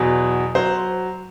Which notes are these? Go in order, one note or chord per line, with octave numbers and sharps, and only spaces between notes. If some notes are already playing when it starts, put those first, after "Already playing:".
Already playing: E2 B2 F#3
F#3 C5